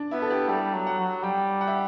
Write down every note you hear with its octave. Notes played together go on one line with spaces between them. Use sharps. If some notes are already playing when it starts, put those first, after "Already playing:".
Already playing: D4
B3 E4
A4
G4
G3 A4
F#3
F#5
F#3
G3 G5
F#5
E5